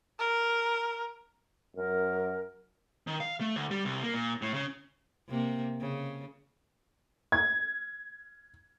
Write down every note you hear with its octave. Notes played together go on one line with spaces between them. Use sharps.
A#4
F#2 A#4
D#3
F5
A3
D2
G3
C2
A#3
A#2
A2
C#3
C3 A#3
C#3
G#6